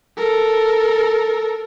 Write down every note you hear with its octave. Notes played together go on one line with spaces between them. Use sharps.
A4 A#4